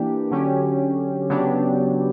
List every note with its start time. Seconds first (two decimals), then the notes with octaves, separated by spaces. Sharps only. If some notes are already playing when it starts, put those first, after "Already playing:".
Already playing: E3 A#3 D4 G4
0.31 D3 F#3 C#4 G4
1.30 C#3 F#3 B3 D4 G4